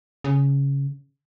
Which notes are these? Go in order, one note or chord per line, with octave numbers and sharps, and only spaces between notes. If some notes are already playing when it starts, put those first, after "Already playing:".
C#3